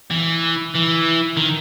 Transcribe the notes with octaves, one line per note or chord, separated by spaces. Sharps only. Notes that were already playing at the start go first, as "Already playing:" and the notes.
E3
E3
D#3